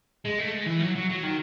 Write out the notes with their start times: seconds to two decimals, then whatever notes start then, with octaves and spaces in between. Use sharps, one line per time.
0.25 G#3
0.39 A3
0.52 G#3
0.66 E3
0.81 F#3
0.96 F#3
1.10 F#3
1.23 D#3